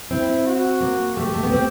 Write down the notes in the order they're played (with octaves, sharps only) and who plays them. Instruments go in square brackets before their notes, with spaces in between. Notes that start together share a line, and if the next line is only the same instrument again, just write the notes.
[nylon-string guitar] C4 [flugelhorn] E4
[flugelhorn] F#4
[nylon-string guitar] A#3
[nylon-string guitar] A3 [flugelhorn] G4
[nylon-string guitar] G#3
A3
B3
C4